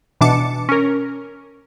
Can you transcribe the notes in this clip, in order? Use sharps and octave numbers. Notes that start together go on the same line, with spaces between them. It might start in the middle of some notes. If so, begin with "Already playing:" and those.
B2 E3 D4 A5 D6 C#7
C#4 A#4